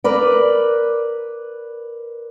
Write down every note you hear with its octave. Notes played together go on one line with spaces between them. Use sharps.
A#4 B4 D5